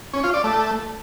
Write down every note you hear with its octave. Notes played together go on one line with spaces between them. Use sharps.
C#4
F4
D5
A3